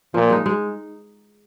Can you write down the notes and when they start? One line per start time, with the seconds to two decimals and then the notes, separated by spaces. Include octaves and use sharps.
0.14 A#2 F3
0.30 G#3 D#4
0.46 G#3